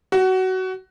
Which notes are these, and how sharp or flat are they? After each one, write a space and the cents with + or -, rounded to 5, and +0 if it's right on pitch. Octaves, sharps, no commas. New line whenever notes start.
F#4 +20